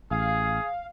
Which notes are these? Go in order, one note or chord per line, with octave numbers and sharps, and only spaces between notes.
A1 G#4 F5